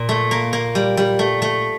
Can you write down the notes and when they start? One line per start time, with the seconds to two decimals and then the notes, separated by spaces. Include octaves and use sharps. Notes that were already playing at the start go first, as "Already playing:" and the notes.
Already playing: A#2
0.09 A3
0.31 A#3
0.53 A#3
0.75 G3
0.97 G3
1.19 A3
1.42 A3